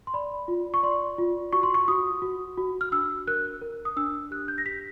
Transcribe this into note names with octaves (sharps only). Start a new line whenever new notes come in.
C6
D5 B5
F4
C#6
D5 C6
F4
F#4 C#6
C6
C#6
F#4 D#6
F#4
F#4
F6
D4 E6
A#4 F#6
A#4
D#6
D4 E6
G4 F#6
G6
A#6
G4 B6